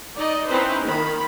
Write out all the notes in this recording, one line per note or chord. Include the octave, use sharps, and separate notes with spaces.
D#4 D5 D#5
C4 C#4 D#4 E4 B4 C5
D#3 F4 B5